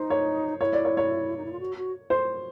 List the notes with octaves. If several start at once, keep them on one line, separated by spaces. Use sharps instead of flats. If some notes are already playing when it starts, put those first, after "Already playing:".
Already playing: D#4 C5
C#5
E4 C#5
D5
C#5
C#5
D#4
E4
F4
F#4
F#4
C5